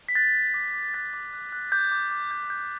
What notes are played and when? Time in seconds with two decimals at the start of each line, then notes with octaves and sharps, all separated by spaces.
0.09 B6
0.15 F#6 A6
0.35 F#6
0.54 D6
0.74 D6
0.93 F#6 A6
1.14 D6
1.33 F#6
1.52 F#6
1.72 D6 G6
1.92 D6
2.11 D6
2.31 G6
2.50 G6